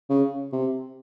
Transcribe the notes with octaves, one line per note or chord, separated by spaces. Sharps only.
C#3
C3